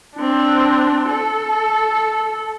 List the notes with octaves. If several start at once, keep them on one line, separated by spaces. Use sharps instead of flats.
C4 D4
A4